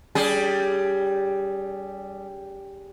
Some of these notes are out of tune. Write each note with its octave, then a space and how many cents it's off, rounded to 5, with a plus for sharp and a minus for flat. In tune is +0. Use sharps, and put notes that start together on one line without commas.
G3 +0 C#4 +45 G#4 +10